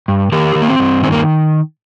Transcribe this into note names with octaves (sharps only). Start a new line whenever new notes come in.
G2
D#3 G4 A#4
D#3
A#3
C4
G2
D#3 C4
A#3